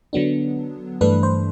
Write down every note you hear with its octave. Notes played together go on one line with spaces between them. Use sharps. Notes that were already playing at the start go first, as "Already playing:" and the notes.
D3 F#3 B3 D4
G2 E3 A3 D4 B4
C5